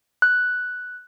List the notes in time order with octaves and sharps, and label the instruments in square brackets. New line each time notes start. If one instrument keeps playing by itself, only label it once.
[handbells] F#6